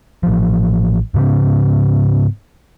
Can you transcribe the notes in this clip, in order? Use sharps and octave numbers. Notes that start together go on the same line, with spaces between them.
A1 F3
G#2 C#3 B3 C#4